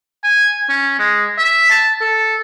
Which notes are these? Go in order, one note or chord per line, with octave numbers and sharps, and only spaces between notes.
G#5
C#4
G#3
E5
A5
A4